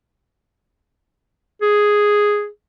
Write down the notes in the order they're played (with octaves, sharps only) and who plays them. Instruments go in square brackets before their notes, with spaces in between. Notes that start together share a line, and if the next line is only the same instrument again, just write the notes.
[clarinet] G#4